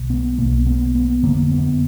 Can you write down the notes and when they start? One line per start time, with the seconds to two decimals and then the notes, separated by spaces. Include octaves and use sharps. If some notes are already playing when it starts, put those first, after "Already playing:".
Already playing: B1 B2
0.10 B3
0.38 B1 B2 A#3
0.67 B3
0.95 B3
1.23 F#1 F2 D3 A#3
1.51 B3